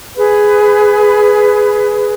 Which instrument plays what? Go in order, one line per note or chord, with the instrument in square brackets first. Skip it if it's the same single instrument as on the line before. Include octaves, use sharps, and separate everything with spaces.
[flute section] G#4 B4